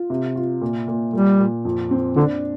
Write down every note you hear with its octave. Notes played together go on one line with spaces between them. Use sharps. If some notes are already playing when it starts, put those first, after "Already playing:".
Already playing: F4
C3
F4
A#2
A#2
A#2 G3
A#2
F2
C4
D3 D4